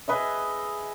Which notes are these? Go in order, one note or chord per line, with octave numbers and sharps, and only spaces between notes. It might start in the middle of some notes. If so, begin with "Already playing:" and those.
G#4 B4 D#5 E5